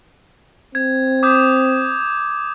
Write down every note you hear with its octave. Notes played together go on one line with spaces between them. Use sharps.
C4 G#6
D6 D#6 G6